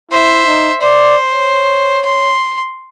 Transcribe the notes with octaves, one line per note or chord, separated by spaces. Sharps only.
E4 C5 E5
D#4
C5 D5
C#5
C6